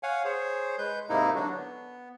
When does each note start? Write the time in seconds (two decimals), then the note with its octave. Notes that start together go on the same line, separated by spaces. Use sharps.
0.03 C#5 F5 F#5 G#5
0.24 G#4 C5 C#5
0.78 G#3 B4 G6
1.09 G#2 C3 A#3 D#4 E4
1.35 D3 F#3 D4 F#4
1.50 B3